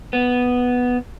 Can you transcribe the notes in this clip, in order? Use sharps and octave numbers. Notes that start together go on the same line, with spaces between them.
B3